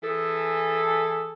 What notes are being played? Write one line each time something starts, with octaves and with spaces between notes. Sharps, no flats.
E3 G#4 A4